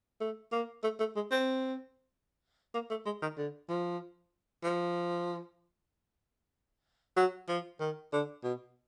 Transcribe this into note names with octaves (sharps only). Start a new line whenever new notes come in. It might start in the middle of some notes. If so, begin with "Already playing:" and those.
A3
A#3
A3
A3
G#3
C4
A#3
A3
G#3
D#3
D3
F3
F3
F#3
F3
D#3
D3
B2